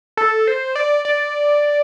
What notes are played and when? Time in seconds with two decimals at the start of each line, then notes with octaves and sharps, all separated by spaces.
0.17 A4
0.47 C5
0.75 D5
1.05 D5